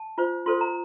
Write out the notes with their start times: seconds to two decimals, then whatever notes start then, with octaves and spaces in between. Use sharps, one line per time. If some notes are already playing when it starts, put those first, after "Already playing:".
Already playing: A5
0.18 F4 C5
0.46 F4 A4 C5 C6
0.61 A#5